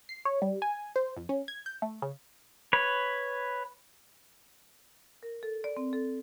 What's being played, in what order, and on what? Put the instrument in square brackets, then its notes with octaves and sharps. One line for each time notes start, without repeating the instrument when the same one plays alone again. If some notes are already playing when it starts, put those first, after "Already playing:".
[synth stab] C7
C#5
G3
G#5
C5
F2
C#4
G#6
G6
A3
C#3
[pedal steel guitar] B4 C#5
[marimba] A#4
A4
D5
C4
A4